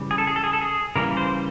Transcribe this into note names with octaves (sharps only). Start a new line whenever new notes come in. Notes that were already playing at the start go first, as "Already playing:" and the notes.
Already playing: C#3 E3 G3
G#4
A4
G#4
A4
G#4
A4
G#4
C#3 E3 G3 A#3 A#4
C5